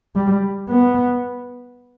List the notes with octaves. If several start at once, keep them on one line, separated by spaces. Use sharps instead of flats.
G3
B3